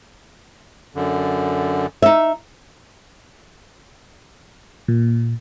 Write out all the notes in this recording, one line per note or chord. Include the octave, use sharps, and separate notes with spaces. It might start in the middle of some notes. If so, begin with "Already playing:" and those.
F#2 D3
D#4 E5
A#2